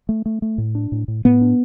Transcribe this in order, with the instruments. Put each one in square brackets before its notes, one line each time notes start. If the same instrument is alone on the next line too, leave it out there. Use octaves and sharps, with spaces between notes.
[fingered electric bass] A3
A3
A3
A2
D4
A2
A2
[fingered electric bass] A2 [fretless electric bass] B3
[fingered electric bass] D4